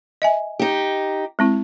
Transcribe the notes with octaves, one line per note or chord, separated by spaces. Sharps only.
D#5 E5 G#5
D#4 G4
G#3 C4 E4